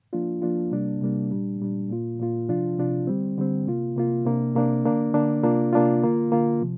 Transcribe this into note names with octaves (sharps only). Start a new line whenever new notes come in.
F3 A#3 D4 F4
F3 A#3 D4 F4
C3 G3 A#3 D4
C3 G3 A#3 D4
A#2 G3 D4
A#2 G3 D4
A#2 A#3 F4
A#2 A#3 F4
C3 F3 D4 F4
C3 F3 D4 F4
D3 G3 C4
D3 G3 C4
C3 A#3 F4
C3 A#3 F4
C3 A#3 D4
C3 A#3 D4
D3 A#3 D4
D3 A#3 D4
C3 A#3 D4 F4
C3 A#3 D4 F4
D3 A#3 F4
D3 A#3 F4
C3 F3